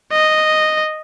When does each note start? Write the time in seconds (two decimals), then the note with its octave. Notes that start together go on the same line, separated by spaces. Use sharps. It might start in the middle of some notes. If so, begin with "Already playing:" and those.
0.13 D#5